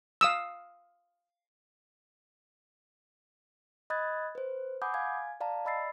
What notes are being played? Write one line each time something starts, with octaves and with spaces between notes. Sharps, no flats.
F5 D#6 E6
D#5 B5 D#6 F#6 G#6 A6
B4 C5
F#5 G#5 B5 D6 D#6 G6
F5 G#5 G#6
D5 F5 A5 A#5
D5 D#5 B5 E6 A6 C7